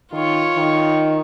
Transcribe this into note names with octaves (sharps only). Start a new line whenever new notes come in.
D#3 F4 C#5
D#3